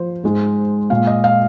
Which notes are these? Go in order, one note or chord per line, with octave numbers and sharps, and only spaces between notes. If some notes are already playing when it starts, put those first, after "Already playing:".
Already playing: F3 C5
G#2 G#3
A#2 G#3 F5
D#5
F5